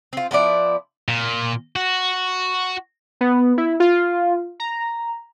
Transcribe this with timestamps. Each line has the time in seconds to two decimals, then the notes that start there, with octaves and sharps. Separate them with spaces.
0.13 C4 F4
0.31 F3 B3 E4 D5
1.08 A#2
1.76 F#4
3.21 B3
3.58 E4
3.80 F4
4.60 A#5